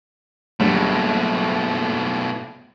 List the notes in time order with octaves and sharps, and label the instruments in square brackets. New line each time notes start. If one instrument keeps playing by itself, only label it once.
[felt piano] F#1 D3 G3 [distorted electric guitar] B2 A3